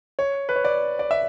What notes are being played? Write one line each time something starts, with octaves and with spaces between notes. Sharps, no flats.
C#5
B4
C#5
D5
D5
E5